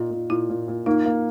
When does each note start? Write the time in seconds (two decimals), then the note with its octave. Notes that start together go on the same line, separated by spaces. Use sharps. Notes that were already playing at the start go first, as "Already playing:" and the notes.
Already playing: A#2 D#4
0.11 A#2
0.30 A#2 E4
0.50 A#2
0.68 A#2
0.86 A#3 D#4
1.06 A#3